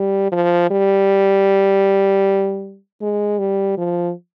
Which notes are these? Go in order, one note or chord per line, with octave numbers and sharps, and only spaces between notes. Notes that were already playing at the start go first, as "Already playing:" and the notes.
Already playing: G3
F3
G3
G#3
G3
F3